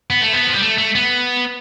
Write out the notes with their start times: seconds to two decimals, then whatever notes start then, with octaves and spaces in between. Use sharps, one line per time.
0.10 B3
0.22 A3
0.33 B3
0.47 F3
0.53 G3
0.62 A3
0.78 A3
0.95 B3